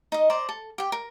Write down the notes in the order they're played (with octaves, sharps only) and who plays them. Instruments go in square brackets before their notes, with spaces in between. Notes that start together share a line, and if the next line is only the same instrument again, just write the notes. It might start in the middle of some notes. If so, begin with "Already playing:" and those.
[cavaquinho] D#4 D#5
C5 D5 A#5
A4
G4 G5
A#4